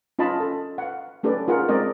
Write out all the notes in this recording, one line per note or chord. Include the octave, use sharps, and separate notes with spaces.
C#4 F4 D#5 A5 B5
A4
F5 F#5
A3 C#4 G4 A4 B4 D5
F4 G#4 A#4 F#5
G#3 C4 A#4 D5 D#5